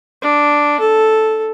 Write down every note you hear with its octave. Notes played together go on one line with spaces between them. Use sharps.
D4
A4